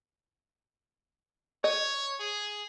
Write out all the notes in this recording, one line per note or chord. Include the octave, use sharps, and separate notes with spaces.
C#5 D#5
G#4